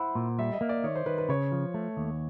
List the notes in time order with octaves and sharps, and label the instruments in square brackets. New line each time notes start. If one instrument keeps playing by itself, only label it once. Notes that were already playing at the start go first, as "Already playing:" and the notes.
Already playing: [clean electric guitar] E4 [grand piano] C5 F#5
[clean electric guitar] A#2
[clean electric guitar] G3 [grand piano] E5
[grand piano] D#5
[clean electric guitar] A#3
[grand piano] D5
[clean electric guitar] D#3 [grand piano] C#5
[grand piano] C5
[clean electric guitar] D#3 [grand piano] B4
[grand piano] B4
[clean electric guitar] C#3 [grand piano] C#5
[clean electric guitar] F3
A3
D#2